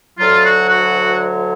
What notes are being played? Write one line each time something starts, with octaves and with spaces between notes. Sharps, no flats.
D2 D3 F#3 F4
F#4
F#4